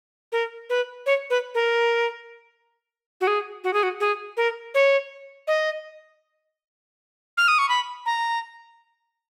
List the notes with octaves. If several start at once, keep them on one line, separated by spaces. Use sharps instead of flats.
A#4
B4
C#5
B4
A#4
F#4
G#4
F#4
G#4
F#4
G#4
A#4
C#5
D#5
F6
D#6
C#6
B5
A#5